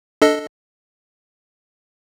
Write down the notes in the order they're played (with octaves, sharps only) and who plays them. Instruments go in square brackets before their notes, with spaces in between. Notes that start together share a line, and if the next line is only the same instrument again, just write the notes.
[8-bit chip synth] D4 A4 D#5